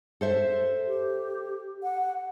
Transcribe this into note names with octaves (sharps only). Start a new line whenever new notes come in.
A4 C5 E5
G4
F#5